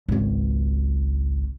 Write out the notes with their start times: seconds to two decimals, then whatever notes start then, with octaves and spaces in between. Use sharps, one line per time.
0.09 G#1 C#2